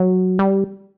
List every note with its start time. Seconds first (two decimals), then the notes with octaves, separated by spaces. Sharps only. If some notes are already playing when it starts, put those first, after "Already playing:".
Already playing: F#3
0.39 G3